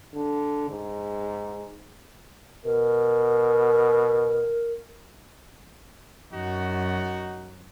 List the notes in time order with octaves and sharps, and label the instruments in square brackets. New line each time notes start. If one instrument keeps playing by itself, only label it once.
[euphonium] D3
G#2
[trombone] B2 [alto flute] A#4
[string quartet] F#2 [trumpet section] D#4 F#4